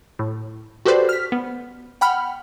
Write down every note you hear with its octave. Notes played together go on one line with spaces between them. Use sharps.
A2
F#4 G4 A4 B4 C5 D5
F6 B6
B3
F#5 G5 B5 F6